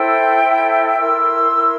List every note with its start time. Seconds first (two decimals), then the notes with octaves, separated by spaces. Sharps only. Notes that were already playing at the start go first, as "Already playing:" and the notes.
Already playing: E4 A4 C5 E5 G5
0.43 E4 A4 C5
0.96 E4 A#4 C6 E6
1.51 E4 A#4